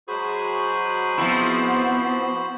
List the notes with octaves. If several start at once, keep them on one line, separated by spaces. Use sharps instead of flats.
F#3 G#3 F#4 G#4 C5 B5
F3 B3 C4 E4